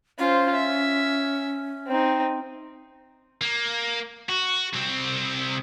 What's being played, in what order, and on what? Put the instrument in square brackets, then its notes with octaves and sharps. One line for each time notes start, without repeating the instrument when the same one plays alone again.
[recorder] C#4 [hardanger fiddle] F4 C5
[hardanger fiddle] E5
C4 D#4
[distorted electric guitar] A#3
F#4
C2 C4